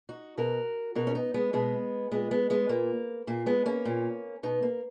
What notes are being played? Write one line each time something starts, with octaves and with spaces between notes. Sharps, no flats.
D#4 F#4
B2 F#4 A#4
B2 F#4 A#4
C#4
B3 D#4
G#3 B3
B2 G#3 B3
A#2 G#3 B3
G#3 B3
G#3 B3
A#2 A#3
A#2 A#3
G#3 B3
A#3 C#4
A#2
B2 B3 D#4
A#3